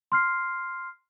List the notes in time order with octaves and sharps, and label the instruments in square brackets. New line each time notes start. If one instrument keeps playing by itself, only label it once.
[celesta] C6 F6 C7